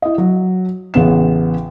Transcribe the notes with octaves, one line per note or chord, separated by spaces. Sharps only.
E4 D#5
F#3
A1 C#3 B3 E7